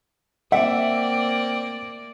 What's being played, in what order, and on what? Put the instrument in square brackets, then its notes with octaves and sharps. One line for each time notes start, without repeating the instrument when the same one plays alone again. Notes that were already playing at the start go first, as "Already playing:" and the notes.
[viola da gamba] A#3 D5 [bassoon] C4 [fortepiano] E5 [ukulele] F#5